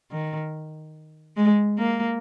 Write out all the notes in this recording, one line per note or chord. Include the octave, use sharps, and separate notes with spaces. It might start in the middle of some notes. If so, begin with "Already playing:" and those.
D#3
G#3
A#3